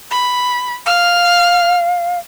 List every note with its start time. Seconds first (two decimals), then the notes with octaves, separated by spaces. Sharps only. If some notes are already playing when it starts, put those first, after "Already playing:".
0.11 B5
0.86 F5 F6